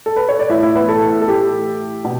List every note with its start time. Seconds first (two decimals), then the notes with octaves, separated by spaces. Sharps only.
0.06 A4
0.16 B4
0.29 C#5
0.39 D5
0.50 A2 E3 E4 E5
0.63 E4 E5
0.75 B3 B4
0.89 A4
1.22 A4
1.28 A2 E3 G4
2.04 B2